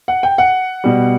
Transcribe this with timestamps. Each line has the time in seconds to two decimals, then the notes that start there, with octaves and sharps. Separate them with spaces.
0.08 F#5
0.23 G5
0.38 F#5
0.84 B2 G3